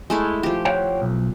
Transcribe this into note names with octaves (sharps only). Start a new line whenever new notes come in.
G#3 A3 E4
F3 G4
C#5 F#5 G5
B1